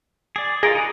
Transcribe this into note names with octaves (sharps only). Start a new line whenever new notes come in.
G#4 D5
F4 G#4 A#4 D#5
D#4 B4